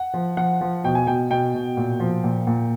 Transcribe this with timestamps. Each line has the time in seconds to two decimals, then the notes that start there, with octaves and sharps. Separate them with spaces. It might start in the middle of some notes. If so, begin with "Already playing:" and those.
Already playing: F#5
0.14 F3
0.37 F3 F#5
0.61 F3
0.84 B2 G5
0.95 G#5
1.07 B2 G5
1.30 B2 G5
1.54 B2
1.77 A#2
2.00 F3
2.24 A#2
2.47 A#2